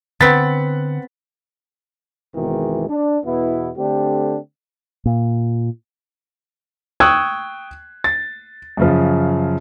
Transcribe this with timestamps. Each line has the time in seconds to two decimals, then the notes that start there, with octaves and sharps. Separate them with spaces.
0.21 D3 B3 C4 F#5 A6 B6
2.35 G#1 E2 G#2 B2 D#3 E3
2.89 D4
3.25 E2 B2 B3 E4
3.78 D3 A3 C4 D4 G4
5.06 A#2
7.00 G5 C#6 D#6 E6 F#6 G#6
8.04 A6
8.77 F#2 C#3 F3